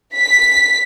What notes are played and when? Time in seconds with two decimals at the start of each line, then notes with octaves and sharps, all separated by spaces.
0.15 B6